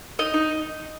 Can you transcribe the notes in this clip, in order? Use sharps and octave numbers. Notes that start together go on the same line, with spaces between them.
D#4 D#5
D#4